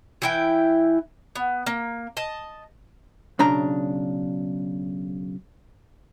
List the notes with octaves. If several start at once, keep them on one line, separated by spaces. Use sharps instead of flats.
E3 E4 G5
B3
A#3
D#5 A5
B1 C#3 D4 A#5